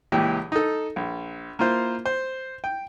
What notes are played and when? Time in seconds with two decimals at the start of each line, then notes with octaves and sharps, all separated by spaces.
0.12 C#2 A#2 E3 G4
0.52 D#4 A4
0.96 A#1
1.59 A#3 E4 F4 C5
2.06 C5
2.64 G5